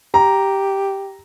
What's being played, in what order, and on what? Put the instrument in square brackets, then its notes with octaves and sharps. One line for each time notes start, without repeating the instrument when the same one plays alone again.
[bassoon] G4 [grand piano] A#5